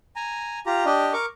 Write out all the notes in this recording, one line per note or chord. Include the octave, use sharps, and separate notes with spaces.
G#5 A#5
F4 G4 A#5
D4 G4 D#5
A#4 C#6 D6